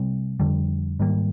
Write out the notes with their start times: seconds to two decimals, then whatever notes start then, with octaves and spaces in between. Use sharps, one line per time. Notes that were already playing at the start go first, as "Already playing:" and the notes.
Already playing: C3 G3 C4
0.40 F2 D3 G3
1.00 G#2 D#3 G3 A#3